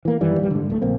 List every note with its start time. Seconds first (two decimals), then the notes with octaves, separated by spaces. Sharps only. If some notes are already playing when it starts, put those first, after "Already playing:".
0.05 E3 A#3
0.21 F#2 D#3 E3 G3
0.39 D1 G3
0.51 G#2 D3
0.70 D1 A3
0.82 A#1 A#3 C4